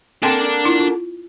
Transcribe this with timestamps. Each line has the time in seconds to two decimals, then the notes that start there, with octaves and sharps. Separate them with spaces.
0.23 A#3 C4 D4 A4 F#5 G5 A5 C6
0.65 E4 F4
0.80 F4